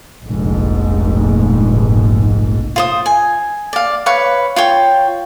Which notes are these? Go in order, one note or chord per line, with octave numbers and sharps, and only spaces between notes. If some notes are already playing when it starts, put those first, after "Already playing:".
F1 A#1 G#2
F4 C5 D#6
G#5
D5 F5
B4 C#5 F5 C#6
F4 C#5 G5